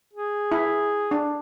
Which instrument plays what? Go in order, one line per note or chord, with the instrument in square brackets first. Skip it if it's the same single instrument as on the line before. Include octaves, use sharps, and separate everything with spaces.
[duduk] G#4
[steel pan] E4
D4